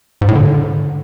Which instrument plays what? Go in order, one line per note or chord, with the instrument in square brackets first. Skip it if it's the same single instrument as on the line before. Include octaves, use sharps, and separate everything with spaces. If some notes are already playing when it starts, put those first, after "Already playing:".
[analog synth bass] G#2
A2
D3